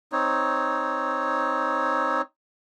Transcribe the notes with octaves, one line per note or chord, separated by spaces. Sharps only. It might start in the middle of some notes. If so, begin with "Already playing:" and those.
C4 D#4 C#5